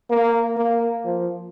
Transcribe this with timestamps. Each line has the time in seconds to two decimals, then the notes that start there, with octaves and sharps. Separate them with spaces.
0.10 A#3
0.57 A#3
1.05 F3